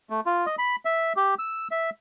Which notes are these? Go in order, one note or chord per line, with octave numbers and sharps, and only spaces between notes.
A3
F4
D#5
B5
E5
G4
E6
E5